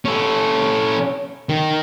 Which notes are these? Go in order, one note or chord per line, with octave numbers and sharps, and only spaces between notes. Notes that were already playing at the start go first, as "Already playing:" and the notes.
C#4 A4
D#3